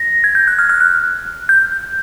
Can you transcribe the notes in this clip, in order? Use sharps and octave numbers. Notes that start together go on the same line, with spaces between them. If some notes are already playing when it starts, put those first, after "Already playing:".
Already playing: A#6
G#6
G6
F#6
F6
F6
F#6
G6